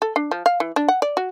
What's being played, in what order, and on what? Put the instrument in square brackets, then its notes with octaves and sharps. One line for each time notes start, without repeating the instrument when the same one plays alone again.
[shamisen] A4
D4
F3
F5
E3
D4
F#5
D5
F#4